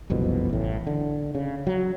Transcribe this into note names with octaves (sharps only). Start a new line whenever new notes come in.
F#1 C2 F2 B2
A1 A2
D3
C#3
F#3